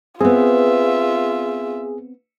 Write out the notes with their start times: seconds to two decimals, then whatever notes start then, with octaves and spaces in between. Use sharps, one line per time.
0.21 B3 C4 F4 G#4 E5